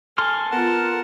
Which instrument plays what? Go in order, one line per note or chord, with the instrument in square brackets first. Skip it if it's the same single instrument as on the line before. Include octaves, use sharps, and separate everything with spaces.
[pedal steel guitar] A4 C6 F6 [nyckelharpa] G#5
[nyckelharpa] B3 F4 [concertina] A#4 F#5 A5